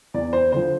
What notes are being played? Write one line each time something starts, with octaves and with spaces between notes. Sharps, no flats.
E2 D5
C5
D3 F3 C5